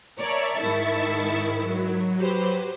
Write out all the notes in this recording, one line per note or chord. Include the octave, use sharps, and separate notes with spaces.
A#4 C#5 D5 E5 A5 C#6
G#2 D#3 E4
F#3
G4 B4 C5